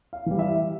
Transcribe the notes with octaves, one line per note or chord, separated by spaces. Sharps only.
F5
E3 G3
E5